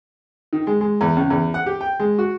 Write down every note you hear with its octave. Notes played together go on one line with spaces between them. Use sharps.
D#3
G#3
G#3
E2
C#2
E2
F#5
G4
G5
G#3
F#4